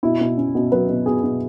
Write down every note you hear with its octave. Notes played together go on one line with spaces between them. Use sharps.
B2 E4
B2
B2 C#4
B2
F#3 B4
B2
B2 G#4
B2